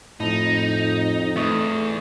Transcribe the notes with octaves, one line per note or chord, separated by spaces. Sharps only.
F2 A2 D#4
E2 A3 C#6 D#6